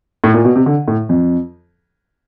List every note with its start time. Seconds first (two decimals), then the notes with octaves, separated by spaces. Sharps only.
0.24 A2
0.34 A#2
0.45 B2
0.56 C3
0.66 D3
0.88 A2
1.09 F2